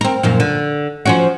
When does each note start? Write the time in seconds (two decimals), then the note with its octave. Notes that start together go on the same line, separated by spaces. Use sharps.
0.01 C4 A#4
0.23 F#2 A#2 F3
0.40 D3
1.06 F3 C#4 F#4